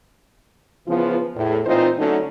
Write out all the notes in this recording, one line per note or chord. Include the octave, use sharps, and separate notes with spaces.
C#3 E3 F3 B3 F4
E2 A2
A#2 E3 C4 D#4 F4 C5
D3 F#3 A3 C#4 D#4